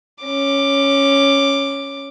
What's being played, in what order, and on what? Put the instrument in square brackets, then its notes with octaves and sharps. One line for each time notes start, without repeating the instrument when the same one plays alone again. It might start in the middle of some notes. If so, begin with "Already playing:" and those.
[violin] C#4 D6